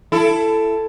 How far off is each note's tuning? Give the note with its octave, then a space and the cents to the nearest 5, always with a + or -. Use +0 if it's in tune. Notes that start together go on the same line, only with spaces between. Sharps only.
E4 +20 A4 +0